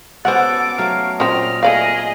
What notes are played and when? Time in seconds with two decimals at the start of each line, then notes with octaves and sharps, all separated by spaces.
0.25 B3 C#4 F#4 A4 C5 F#5 D6
0.78 F#3 A3 C#5 F5
1.20 A#2 C4 C#4 D#5 F6
1.63 A3 G#4 A#4 D5 D#5 F5